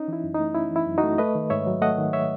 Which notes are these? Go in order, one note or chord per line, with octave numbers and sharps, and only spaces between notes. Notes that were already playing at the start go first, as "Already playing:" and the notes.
Already playing: C#4 D#4
E3 E4
F#2
A3 D#4
C#4 E4
E3
E4
F#2
D#4 F#4
A3
A3 B4 D#5
D#3
G#2 C#5 E5
F#3
A3 D#5 F#5
D#3
C#5 E5